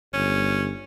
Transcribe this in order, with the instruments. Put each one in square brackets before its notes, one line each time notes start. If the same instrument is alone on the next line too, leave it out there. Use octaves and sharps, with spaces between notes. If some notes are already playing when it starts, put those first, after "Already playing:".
[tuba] G1 [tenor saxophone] C#4